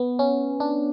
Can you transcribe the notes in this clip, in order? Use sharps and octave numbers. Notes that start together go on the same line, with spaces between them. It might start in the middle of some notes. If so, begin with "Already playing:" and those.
Already playing: B3
C#4
D4